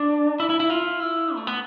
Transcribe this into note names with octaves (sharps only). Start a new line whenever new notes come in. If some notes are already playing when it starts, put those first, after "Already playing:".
Already playing: D4
E4
E4
E4
F4
E4
A3
B3